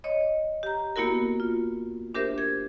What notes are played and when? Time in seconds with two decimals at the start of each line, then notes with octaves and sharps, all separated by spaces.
0.04 C#5 D#5
0.63 G4 A#5
0.96 A#3 B3 E4 F#4 A#4
1.40 F4
2.14 D4 G4 A#4 C5 E5
2.38 G#6